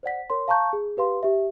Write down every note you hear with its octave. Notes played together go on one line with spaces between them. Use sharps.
C5 D5 F#5 B6
A#4 C#5 C6
F5 A5 A#5 C#6 G6
G#4
G4 B4 F5 C6
G4 E5